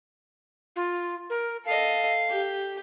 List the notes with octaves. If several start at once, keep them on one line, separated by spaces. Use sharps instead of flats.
F4
A#4
A4 D#5 F5
G4